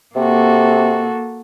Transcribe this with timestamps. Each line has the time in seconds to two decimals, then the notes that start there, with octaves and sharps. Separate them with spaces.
0.16 C3 A#3 F#4 A4